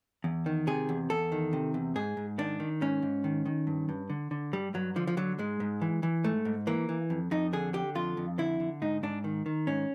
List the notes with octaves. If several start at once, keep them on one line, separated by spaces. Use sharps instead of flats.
E2
D#3
C3 G#4
E2
E2 A4
D#3
C3
E2
G#2 G#4
G#2
D#3 D4
D#3
G#2 C#4
G#2
D#3
D#3
G2
G2
D3
D3
G2 G3
G2 F#3
D3 F3
F3
D3 F#3
G#2 G#3
G#2
E3
E3
G#2 A3
G#2
E3 A#3
E3
F2
F2 D#4
D3 G#4
D3 G4
F2 F4
F2
D3 E4
D3
G#2 D#4
G#2 D4
D#3
D#3
G#2 C#4